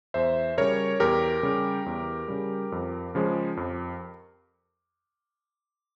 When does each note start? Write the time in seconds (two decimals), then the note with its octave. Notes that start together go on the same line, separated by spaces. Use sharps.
0.14 E2 C5 E5
0.58 C#3 G3 A#4 C#5
1.00 E2 G4 A#4
1.43 C#3 G3
1.86 E2
2.28 C#3 G3
2.72 F2
3.15 C#3 F3 G#3
3.57 F2